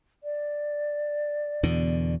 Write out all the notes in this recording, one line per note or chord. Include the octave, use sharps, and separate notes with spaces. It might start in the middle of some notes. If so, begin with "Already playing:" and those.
D5
E2 B2 D3